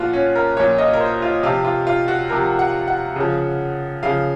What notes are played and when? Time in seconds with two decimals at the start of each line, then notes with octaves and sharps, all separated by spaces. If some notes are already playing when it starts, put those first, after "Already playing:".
Already playing: A#2 F3 F4 F#4
0.13 C#4
0.36 A#4
0.57 A#2 F3 C#5
0.78 D#5
0.94 A#4
1.00 C5
1.22 F4
1.43 C3 F3 F4
1.65 F4
1.87 F4
2.08 F#4
2.29 C3 F3 A#4
2.59 F#5
2.88 F#5
3.16 C#3 F3
4.03 C#3 F3 F5